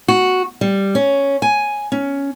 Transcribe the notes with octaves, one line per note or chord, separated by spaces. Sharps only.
F#4
G3
C#4
G#5
C#4